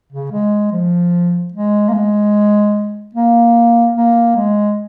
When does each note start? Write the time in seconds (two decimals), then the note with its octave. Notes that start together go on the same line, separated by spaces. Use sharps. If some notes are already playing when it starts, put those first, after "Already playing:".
0.12 C#3
0.32 G#3
0.72 F3
1.54 G#3
1.89 A#3
1.93 G#3
3.15 A#3
3.96 A#3
4.36 G#3